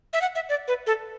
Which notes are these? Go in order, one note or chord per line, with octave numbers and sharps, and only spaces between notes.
E5
F#5
E5
D5
B4
A4